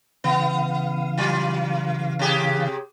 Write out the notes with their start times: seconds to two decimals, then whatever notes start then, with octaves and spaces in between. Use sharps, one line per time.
0.24 C#3 E3 B3 F5
1.18 F#3 F4
2.19 C3 G4 G#4